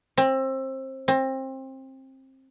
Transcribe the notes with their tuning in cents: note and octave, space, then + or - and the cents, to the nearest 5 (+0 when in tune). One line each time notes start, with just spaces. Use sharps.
C4 +25
C4 +25